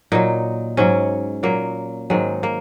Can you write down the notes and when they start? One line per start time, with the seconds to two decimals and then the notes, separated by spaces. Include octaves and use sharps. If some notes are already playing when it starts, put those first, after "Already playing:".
0.12 A#2 F#3 D#4
0.77 G#2 F#3 C#4
1.43 A#2 F#3 A#3
2.10 G#2 D#3 F#3 G#3
2.43 A#3